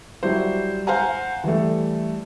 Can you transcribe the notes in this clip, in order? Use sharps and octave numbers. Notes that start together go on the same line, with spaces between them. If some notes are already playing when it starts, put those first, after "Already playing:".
F#3 G3 E4 C5
C5 F5 F#5 G#5 A#5
E3 G3 A3